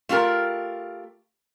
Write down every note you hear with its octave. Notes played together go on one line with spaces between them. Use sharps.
A3 F4 G4 A#4